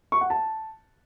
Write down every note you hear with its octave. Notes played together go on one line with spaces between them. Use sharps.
C#6
F#5
A5